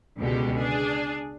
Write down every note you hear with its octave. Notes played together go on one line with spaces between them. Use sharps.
C#2 B2 D3 G#3 G4
D4 G#4